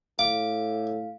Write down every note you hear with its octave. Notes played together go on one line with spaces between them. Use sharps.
A2 F5 D6